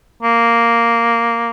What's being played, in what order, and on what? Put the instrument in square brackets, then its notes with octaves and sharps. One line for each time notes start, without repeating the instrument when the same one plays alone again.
[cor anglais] A#3